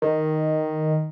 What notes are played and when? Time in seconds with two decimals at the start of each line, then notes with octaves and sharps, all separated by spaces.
0.02 D#3